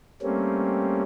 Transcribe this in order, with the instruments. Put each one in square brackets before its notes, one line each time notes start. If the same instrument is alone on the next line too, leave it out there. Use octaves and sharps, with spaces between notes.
[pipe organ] G3 A3 A#3 C4 C#4